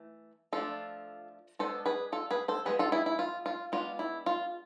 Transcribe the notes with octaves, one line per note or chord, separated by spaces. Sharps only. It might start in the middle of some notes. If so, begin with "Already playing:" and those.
Already playing: E3 A3
F3 A3 D4 F4 A4
G#3 B3 D4 A4 C5
G#4 B4
F4 A4
G#4 B4
A4 C5
F3 G#3 B3 G#4 B4
F4 A4
E4 G#4
E4
F4
F4
G#3 B3 D4 F4
E4
F4